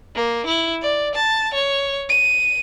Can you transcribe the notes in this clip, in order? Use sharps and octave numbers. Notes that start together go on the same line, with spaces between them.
A#3
E4
D5
A5
C#5
D#7